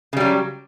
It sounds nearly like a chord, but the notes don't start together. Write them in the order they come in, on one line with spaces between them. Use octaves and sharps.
C#3 G3 F#3